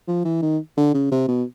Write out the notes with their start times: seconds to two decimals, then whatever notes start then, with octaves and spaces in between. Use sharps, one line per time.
0.07 F3
0.25 E3
0.42 D#3
0.77 D3
0.94 C#3
1.12 C3
1.28 B2